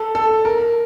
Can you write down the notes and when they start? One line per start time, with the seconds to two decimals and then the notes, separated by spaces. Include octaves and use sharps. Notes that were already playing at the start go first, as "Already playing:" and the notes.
Already playing: A4
0.15 A4
0.45 A#4